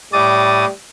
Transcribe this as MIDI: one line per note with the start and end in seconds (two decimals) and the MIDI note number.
0.13 0.65 45
0.13 0.71 55
0.13 0.67 86
0.13 0.65 87
0.13 0.65 93